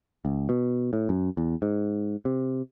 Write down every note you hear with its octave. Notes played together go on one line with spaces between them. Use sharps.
C#2
B2
A2
F#2
E2
G#2
C3